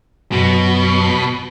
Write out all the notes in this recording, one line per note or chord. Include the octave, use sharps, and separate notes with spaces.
F#2 B2 F#3